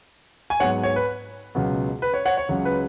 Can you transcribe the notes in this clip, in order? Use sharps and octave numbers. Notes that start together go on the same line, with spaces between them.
G#5
G#2 F#3 B3 C#5 F#5
C#5
B4
C#2 B2 F#3 B3
B4
C#5
C#5 F#5
C#5
C#2 C#3 F#3
B4